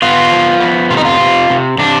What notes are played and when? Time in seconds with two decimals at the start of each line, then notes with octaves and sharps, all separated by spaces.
0.02 B3 F4
0.32 F3
0.60 B3
0.90 C3 F4
0.97 D#4
1.05 F4
1.20 C3
1.50 C3
1.78 C3 D4